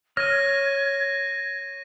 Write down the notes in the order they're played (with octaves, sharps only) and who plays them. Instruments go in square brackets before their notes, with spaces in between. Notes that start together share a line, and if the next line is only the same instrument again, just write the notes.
[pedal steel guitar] C#5 F6 [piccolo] G#6 [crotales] A#6 D#7